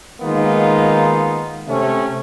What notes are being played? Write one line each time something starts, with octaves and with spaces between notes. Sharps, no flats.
D#3 G#3 A#3 B3 D#4 F4
C3 A3 C#4